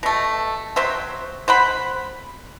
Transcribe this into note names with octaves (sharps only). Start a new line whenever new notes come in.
B2 A3
F#3 C5 E5 G5
C5 F#5 B5